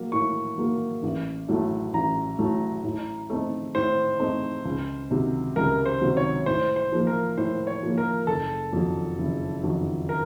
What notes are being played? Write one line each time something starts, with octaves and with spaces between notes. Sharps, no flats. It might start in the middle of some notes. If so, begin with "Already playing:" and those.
Already playing: F#3 A#3
A2 C#6
F#3 A#3
A1
A2 F#3 A3
A1 A#5
A2 F#3 A3
A2
A3 C4 D#4
A2 C5
A3 C4 D#4
C#2
C3 D#3 F#3
C#2 A#4
C5
C3 D#3 F#3
C#5
A2 C5
C5
F3 A#3
A#4
A2 C5
C#5
F3 A#3
A#4
F#1 A4
F2 D#3 F#3
F#1
F2 D#3 F#3
A#4